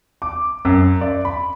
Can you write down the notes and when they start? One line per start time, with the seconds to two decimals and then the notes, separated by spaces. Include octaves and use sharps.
0.22 D6
0.65 F#2
1.01 D5
1.25 B5